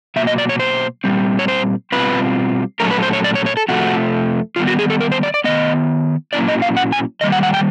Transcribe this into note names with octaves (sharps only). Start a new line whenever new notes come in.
B2 F#3 A#3 E5
D#5
D5
C#5
C5
A#2 G3 C4
C#5
C5
B2 G3 C4 F4 B4
A#2 F#3 A3 C#4 A#4
B4
C5
C#5
D5
C#5
C#5
A4
F2 C3 F3 A3 F#4
D#3 G3 B3 F4
F#4
G#4
A4
A#4
C5
D5
D5
D#3 F#3 B3 D#5
A#2 F#3 A#3 C#4 E4 D5
D#5
F5
F#5
G#5
D#3 G3 A#3 D#5
F#5
F#5
G5